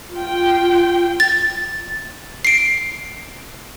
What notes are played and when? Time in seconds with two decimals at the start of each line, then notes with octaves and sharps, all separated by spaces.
0.15 F4 G5
1.20 A6
2.45 C7 D7